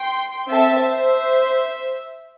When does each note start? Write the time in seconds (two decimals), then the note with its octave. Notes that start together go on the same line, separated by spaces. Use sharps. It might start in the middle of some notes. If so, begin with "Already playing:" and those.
Already playing: G5 C6
0.49 C4 A4 E5 A5
0.82 C5 E5